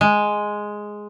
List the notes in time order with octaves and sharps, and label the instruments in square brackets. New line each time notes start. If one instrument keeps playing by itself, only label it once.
[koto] G#3